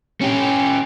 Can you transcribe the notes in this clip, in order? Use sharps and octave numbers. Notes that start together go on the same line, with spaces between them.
C#4 G4